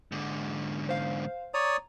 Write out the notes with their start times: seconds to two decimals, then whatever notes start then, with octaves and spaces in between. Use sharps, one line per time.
0.12 G#2 D3
0.89 C5 F5
1.54 C#5 D5 A#5 D#6